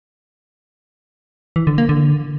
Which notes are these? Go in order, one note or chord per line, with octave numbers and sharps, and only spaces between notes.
E3
D3
A#3
D3